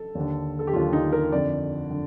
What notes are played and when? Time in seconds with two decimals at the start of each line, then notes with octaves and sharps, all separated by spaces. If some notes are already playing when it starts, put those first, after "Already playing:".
Already playing: A4
0.15 D#2 D3
0.59 A4
0.67 G4
0.73 D#2 D3 F4
0.93 D#4
1.13 A#4
1.32 F2 D3 D5
1.91 D3